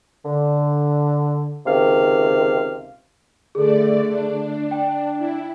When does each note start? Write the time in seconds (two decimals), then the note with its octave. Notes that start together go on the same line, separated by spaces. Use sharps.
0.25 D3
1.65 C#2 C3 D#3 F5
3.55 D3 A3 G#4 A4 D5
4.11 D4
4.71 G5
5.18 E4